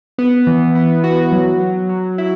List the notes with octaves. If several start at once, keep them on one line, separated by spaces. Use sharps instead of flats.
B3
E3
B3
F#4
F#3
F#3
F#3
E4